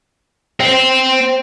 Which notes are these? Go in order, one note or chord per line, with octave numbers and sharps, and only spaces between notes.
C4